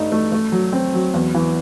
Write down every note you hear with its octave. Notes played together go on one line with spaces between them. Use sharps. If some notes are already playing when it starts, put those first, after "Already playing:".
Already playing: G2 A3 D#4
A3
A3
F#3
C4
F#3
E2
E3